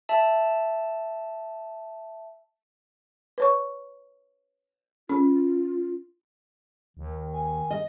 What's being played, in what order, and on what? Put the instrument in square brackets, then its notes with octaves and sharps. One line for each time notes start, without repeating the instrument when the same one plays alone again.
[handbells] E5 A5
[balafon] B4 C#5 C#6
[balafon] C#4 [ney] F4
[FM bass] D#2 [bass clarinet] D#3
[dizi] G#5
[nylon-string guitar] D#5